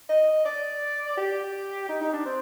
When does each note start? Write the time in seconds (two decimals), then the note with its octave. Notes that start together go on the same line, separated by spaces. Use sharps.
0.09 D#5
0.45 D5
1.17 G4
1.89 D#4
2.01 D#4
2.13 D4
2.25 C4